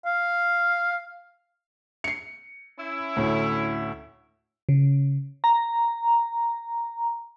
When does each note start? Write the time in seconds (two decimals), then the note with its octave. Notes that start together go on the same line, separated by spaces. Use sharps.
0.06 F5
2.04 C7 C#7
2.78 C#4 E4
3.16 D2 A2
4.69 C#3
5.44 A#5